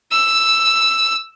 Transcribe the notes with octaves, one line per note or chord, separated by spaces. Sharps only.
E6